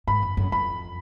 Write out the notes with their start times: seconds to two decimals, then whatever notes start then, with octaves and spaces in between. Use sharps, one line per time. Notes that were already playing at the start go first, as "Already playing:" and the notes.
0.07 G#2 B5
0.22 F#2
0.37 F#2
0.52 F2 B5